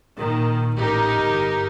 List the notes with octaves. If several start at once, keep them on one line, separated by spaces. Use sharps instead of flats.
A#2 D#3
A1 D#4 G4 A#4
G1 G2